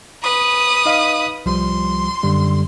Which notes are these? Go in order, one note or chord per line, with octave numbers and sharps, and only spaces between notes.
B4 D#6
D#4 D#5 F5
C2 F3 G3 C6
F#2 D3 G3